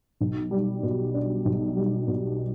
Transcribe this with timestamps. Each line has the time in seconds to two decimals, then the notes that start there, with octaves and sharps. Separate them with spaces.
0.21 B1
0.51 G3
0.83 B2
1.14 D4
1.45 B1
1.77 G3
2.07 B2